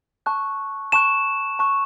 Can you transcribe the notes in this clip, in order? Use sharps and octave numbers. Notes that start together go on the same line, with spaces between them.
A5 C#6 F#6
A5 C#6 F#6 E7
A5 C#6 F#6